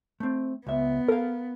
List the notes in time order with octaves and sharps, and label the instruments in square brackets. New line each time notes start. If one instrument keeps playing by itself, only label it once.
[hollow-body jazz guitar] A3 C4
[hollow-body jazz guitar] C#2 E5 [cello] B3
[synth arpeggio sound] A4 [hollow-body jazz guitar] A#4 F5